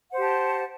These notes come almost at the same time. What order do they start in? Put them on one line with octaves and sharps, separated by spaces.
F#5 C5 G4 A5